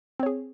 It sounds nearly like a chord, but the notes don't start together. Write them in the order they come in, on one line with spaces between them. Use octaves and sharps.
C4 C#5 G#4